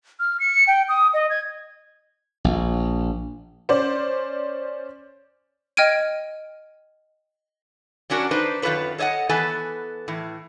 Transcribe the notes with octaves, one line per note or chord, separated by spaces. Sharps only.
F6
C#7
G5
D#6
D#5
G#6
A#1
C#4 C5 D5
D#5 G5 F6 G#6 D7 D#7
F#3 C#4 D4 F#4 A#4
D4 D#4 B4 C5
F#2 D#3 F4 A4 B4 C#5
A4 C#5 D#5 F5 F#5
E3 B3 A4 B4 G#5
A2 E3